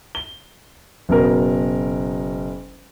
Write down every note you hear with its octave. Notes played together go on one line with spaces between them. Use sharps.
G7
F#1 B2 A#4